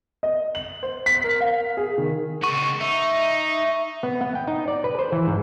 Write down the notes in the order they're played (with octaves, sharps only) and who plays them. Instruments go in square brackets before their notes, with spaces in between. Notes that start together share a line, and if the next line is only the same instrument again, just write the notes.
[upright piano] D#5
F#7
C5
B6
A#4
F5
G#4
D#3
[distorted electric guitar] C#2 F#4 [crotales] C#6
[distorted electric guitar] D#4 [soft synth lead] E5
[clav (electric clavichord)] B3
B3
G5
D#4
D5
B4
C5
E3
G#2